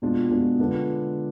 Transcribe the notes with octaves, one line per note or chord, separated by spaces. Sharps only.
B2 G#3 D4 F4
B2 G#3 D4 F4
D3 G#3 D4 F4 B4